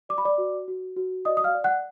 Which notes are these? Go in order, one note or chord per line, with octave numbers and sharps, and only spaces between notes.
D5 D6
B5
D5 D6
F#4
F#4
F#4
D5 D#5 D#6
D#6
F5 F6
D5
F#5 F#6